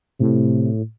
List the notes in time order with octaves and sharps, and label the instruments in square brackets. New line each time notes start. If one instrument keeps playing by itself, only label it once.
[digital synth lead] A2 [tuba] C3